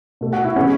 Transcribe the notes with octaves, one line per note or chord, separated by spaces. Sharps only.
B2 A3
F#4
E4
C#3 E3 G#3 B3 C#4